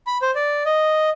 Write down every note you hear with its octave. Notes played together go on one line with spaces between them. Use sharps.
B5
C5
D5
D#5